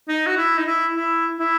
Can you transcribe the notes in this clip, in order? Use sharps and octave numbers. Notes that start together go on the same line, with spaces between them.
D#4
F#4
E4
D#4
E4
E4
E4